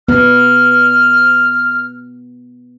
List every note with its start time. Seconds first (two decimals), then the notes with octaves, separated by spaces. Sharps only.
0.09 B3 F6